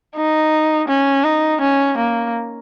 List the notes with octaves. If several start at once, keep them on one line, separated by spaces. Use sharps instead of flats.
D#4
C#4
D#4
C#4
A#3